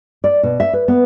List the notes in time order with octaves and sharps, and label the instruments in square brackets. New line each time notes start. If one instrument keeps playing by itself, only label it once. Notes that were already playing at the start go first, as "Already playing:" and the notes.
[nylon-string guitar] D5
B2
E5
B4
B3